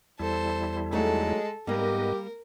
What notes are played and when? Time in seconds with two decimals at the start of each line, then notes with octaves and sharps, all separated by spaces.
0.19 E2 G3 E4 A4 C5
0.92 F#3 G#3 A3 D#4 A4
1.67 G#2 G3 A#3 B3 G4 A#4 D#5